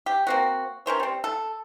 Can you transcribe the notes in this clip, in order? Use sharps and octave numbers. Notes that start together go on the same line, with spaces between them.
G4
A#3 C4 F#4
C#4 A#4 C5 C#5
G3 C4
A4